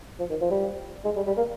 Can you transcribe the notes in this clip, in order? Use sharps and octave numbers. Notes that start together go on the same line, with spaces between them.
F3
D#3
F3
G3
G#3
G3
G3
A#3